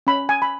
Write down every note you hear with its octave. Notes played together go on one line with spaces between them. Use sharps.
C#4 B5
G#5
B5